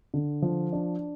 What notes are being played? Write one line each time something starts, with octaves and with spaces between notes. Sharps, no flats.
D3
F3
D4